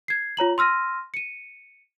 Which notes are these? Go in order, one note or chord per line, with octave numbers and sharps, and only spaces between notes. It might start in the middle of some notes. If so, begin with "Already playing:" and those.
G#6 C7
F4 C#5 A#5 F#7
C6 E6 F6 A#6 D#7
C#7 D#7